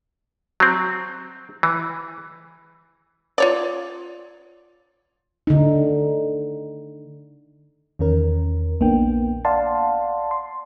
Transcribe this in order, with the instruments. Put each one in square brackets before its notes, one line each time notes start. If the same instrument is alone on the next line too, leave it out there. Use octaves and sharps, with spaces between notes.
[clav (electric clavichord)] F#3 C4
E3
[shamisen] F4 C#5 D5
[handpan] D3 D#4
[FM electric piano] E2 D#3 C#4 A#4
A#1 A#3 B3 D4 G5
D5 F5 F#5 A5 C6
C6